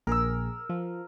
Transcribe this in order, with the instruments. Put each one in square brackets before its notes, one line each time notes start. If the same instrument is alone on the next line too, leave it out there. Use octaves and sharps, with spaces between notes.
[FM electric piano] A#1 G#4 [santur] A#4 E6
[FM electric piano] F3